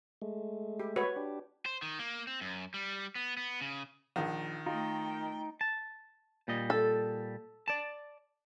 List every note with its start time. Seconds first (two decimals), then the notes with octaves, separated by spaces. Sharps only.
0.22 G#3 A3
0.79 G4
0.96 F#4 B4 C#5
1.16 D4 G4
1.66 C5
1.82 D#3
1.99 A#3
2.27 C4
2.41 F#2
2.74 G3
3.15 B3
3.37 B3
3.61 C#3
4.16 A#1 D#3
4.66 A3 D#4 F4 G5
5.61 A5
6.48 A#2 G3 D#5
6.70 A4
7.68 D5 A5